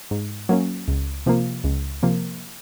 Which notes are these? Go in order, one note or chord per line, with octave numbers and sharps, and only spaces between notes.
G#2
F#3 A#3 C#4
C#2
C3 F3 A#3
C#2
C3 F3 A#3